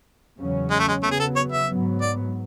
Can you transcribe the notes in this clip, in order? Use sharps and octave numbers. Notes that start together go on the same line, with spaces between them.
E2 C#3 F#3 C#4
G#3
A3
G#3
C#3 F#3 A3 B3
G#4
A4
C#5
E5
G#2 F#3 B3
D5